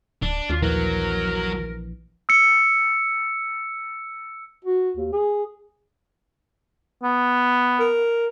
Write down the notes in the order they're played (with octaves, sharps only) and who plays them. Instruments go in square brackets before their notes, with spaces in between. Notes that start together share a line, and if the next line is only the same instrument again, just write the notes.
[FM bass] D1 [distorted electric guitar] D4
[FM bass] D#2 [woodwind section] F4
[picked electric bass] A#1 E3 [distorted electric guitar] F#3 [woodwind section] A#4
[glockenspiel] E6 C#7
[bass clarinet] F#4
D#2
G#4
[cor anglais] B3
[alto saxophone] A#4